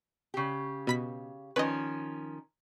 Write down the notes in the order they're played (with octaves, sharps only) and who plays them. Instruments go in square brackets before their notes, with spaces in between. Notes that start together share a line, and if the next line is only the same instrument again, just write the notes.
[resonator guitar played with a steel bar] C#3 G4
[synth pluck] B2 B5 B6
[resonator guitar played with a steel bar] D#3 F3 C#4 [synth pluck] B4 D#5